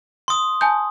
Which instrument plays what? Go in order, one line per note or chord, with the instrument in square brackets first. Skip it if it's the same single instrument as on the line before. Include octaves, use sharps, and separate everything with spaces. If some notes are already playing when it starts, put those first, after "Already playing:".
[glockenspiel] C6 D#6
[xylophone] G#5 A5 G6